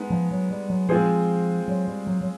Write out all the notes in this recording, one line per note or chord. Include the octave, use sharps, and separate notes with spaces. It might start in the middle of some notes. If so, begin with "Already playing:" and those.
Already playing: G#3 B3 D#4
F3
F#3
G3
F#3
F3 G#3 C4 F4 G#4 C5
F#3
G3
F#3
F#3